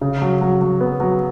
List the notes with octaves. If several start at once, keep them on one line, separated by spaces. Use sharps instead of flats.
C#3
F#3
F#3
F#3
B3
F#3